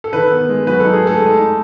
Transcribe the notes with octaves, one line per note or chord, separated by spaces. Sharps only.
A4
D#3 B4
B3
G#3
F#3 B4
D#4 A4
G#4
A3 A4
G#3
D#4